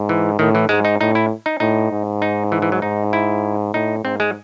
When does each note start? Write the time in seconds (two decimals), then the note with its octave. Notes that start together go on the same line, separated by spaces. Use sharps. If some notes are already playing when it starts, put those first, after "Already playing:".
Already playing: G#2
0.09 E3
0.39 A2 D#3
0.55 E3
0.69 G#2 G#3
0.85 D#4
1.00 A2 D#4
1.15 E4
1.46 D#4
1.60 A2 D#4
1.92 G#2
2.22 D#4
2.52 E3
2.62 E3
2.72 F#3
2.82 G#2 D#4
3.13 E4
3.74 A2 D#4
4.04 G#2 C4
4.20 G#3